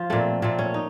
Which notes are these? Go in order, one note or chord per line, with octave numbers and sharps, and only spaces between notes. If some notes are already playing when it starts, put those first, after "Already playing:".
Already playing: F3 F4
A#2 A3 C4
A#2 A3 C4
C#4
D#4